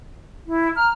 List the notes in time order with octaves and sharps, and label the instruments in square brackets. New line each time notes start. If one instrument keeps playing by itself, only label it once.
[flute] E4
[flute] A#5 [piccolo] F6